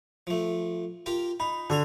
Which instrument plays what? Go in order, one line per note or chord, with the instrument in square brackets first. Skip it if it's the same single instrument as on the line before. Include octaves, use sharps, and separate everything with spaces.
[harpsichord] F3 A3
F4 G4 A#4
[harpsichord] D#4 [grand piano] B5
[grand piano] D3 [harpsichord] F#4 G#5 A#5